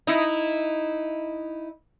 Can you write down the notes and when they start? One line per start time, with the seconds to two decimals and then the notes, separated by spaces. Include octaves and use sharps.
0.07 D#4 E4